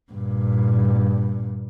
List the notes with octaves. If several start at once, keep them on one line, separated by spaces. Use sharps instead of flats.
G2 A#2